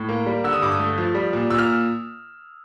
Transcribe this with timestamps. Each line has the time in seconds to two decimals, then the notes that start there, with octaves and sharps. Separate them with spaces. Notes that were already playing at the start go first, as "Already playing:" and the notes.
Already playing: A2
0.09 A#3
0.26 G3
0.44 D3 E6
0.53 D#6
0.62 G2 D6
0.72 D#6
0.79 A3
0.98 F3
1.15 G3
1.33 A#2
1.50 A#2 E6
1.59 F6